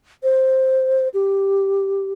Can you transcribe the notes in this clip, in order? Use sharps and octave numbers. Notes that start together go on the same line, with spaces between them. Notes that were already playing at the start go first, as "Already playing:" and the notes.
C5
G4